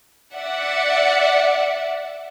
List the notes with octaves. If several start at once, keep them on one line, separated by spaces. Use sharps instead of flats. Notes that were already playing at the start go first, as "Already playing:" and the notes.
D5 E5 F#5